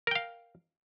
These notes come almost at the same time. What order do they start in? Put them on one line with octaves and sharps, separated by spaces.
A#4 G5 F5